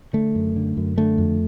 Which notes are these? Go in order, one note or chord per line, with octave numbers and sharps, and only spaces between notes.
D3 A3
F#2
D3
F#2
D3 A3
F2